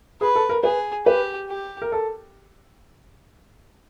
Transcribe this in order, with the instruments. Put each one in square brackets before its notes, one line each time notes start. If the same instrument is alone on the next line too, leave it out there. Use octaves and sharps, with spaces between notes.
[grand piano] G#4 [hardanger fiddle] B4
[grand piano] A4
A#4
[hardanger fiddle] G#4 [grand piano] B4
[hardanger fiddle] G4 [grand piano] B4
[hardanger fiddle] G4
[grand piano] A#4
A4